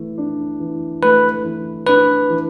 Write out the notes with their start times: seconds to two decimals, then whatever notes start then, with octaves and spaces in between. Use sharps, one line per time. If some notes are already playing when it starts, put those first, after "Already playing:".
Already playing: E3 A3
0.18 D4
0.60 E3
1.03 A3 B4
1.44 E3
1.87 D4 B4
2.30 E3